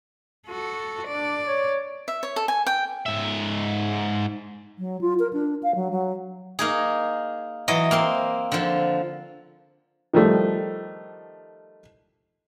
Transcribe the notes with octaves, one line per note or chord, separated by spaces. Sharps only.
F#4 A4
D4 D5
C#5
E5
C#5
A4
G#5
G5
G#2 E5
F#3
F4
A#4
D4
F5
F#3
F#3
A#3 D#4 G#4
E3 F#3 D#5
A#3 C4 C6
D3 F3
D#3 F3 G3 A3